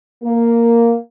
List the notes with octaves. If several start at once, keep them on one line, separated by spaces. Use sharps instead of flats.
A#3